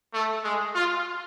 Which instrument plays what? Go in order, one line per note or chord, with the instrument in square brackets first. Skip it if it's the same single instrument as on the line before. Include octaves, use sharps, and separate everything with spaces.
[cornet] A3
G#3
F4